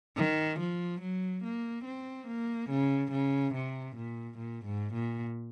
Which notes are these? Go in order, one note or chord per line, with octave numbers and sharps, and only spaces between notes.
D#3
F3
F#3
A#3
C4
A#3
C#3
C#3
C3
A#2
A#2
G#2
A#2